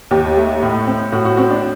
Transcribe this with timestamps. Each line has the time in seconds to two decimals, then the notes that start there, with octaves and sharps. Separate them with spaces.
0.11 D#2 G4
0.37 A3
0.63 A2
0.87 C4
1.12 A2 F#4
1.25 F#4
1.37 C4 F#4
1.51 D4